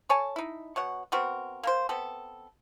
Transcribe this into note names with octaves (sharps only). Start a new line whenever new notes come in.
A4 C#5 G#5 A5
D#4 E4
B2 C#5 F#5
B3 C4 F#4 A#4
A#3 A#4 C5
B3 C4 A4